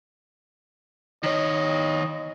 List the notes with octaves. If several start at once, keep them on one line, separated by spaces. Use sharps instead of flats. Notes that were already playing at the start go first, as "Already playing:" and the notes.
D#3 C#5 D#5